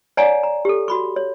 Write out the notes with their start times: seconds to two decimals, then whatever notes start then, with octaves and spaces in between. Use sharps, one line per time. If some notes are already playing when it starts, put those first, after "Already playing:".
0.17 C#5 D5 F#5 G#5 A#5
0.43 A#5
0.65 G4 A4
0.88 F#4 B5 C#6
1.16 C#5